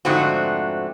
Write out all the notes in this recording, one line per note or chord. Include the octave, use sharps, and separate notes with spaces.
F2 G#2 D3 A3 C4 F#4